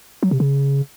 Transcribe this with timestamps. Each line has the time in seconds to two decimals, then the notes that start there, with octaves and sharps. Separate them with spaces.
0.23 F#3
0.31 C3
0.40 C#3